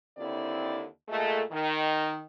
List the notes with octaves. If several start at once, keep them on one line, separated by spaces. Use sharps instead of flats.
D#2 D3 C4 E4 D5
A#2 G#3 A3
D#3